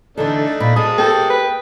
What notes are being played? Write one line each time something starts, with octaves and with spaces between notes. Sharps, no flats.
D3 E3 A3 D4 D#4 A4
A#2 B5
G#3 G#4 A5 D#6
A#3 G4 A4 G5
B4